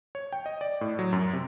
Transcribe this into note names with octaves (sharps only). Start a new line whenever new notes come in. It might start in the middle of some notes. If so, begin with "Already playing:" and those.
C#5
G5
D#5
D5
A2
F#3
F#2
C3